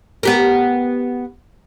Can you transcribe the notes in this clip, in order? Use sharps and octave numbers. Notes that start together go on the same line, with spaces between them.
B3 G4 A#4